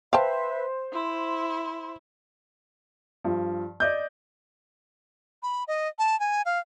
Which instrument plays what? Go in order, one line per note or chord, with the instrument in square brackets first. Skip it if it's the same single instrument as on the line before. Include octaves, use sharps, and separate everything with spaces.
[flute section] B4 E5 [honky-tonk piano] C5 [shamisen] F5 G5 A5
[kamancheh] E4 [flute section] C6
[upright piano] G2 F3
D5 D#5 G6
[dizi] B5
D#5
A5
G#5
F5